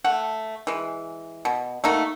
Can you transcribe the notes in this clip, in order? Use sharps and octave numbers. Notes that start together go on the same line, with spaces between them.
A3 F#5
E3 G#3
B2
A3 A#3 D#4 F#4